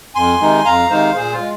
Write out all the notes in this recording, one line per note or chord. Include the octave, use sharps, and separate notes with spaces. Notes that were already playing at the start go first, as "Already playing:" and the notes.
F2 G#5 C6
C3 D#3 G#3 D#4
F2 F5 A#5
C3 D#3 G#3 D#4 C5 F5
A#2 G#4 C5
F4
G#3